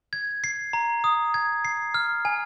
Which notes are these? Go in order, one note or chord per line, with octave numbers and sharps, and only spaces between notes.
G#6
C7
A#5
D#6
G#6
C7
F6
G#5